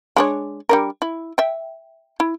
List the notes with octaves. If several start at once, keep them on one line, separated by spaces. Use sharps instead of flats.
G#3 D4 C#5
G3 D4 A#4
E4
E5 G5
E4